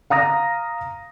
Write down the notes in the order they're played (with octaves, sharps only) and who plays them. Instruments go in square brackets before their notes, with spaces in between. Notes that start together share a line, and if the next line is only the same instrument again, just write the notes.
[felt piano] F5 A#5 D#6 A#6